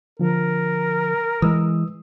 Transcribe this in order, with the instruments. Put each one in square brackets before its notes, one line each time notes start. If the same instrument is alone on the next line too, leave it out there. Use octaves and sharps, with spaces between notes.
[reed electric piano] D3 F3 [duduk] A#4
[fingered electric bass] E3 G#3 [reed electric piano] D#6 E6